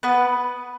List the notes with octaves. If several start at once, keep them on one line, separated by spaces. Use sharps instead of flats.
B3 B4